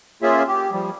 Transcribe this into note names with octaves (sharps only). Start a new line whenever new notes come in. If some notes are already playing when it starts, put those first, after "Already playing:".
A#3 C#4 F4 G#4 E5
G4
F3 G3